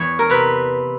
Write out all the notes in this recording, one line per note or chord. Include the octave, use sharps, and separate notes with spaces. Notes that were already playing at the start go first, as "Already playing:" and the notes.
Already playing: E2 C#5
A#4
C3 B4